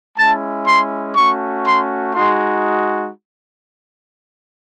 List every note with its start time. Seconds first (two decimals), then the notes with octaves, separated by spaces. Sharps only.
0.17 G#3 C#4 E4 A5
0.66 C6
1.15 A3 C#4 F#4 C#6
1.65 C6
2.15 G#3 D#4 F#4 C6